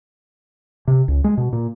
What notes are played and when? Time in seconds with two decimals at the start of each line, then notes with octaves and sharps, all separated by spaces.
0.88 C3
1.08 C#2
1.24 G#3
1.37 B2
1.53 A#2